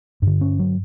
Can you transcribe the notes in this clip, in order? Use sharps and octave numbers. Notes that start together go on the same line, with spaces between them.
G2 D3
C#4
F#3